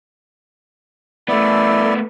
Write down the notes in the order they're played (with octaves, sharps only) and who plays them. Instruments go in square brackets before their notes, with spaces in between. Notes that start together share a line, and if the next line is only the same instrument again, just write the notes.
[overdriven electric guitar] A3 B3 [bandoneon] E4 D5